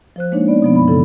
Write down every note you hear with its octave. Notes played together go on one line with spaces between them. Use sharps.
F3 C5 F#6
G#3 A#3 D4 D#4 C#5
B3 D5
B2 F3 B3
F#2 B5
C#3 E3 E4 A4